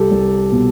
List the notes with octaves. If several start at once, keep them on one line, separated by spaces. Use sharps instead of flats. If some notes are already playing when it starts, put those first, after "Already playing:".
Already playing: C2 G4 A4
C2
B2